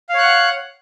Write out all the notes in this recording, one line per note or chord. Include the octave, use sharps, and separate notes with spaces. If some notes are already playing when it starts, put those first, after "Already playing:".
C#5 F5 F#5 F#6